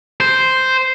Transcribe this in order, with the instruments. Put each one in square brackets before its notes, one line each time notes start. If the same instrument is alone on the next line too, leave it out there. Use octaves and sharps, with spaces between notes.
[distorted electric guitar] C5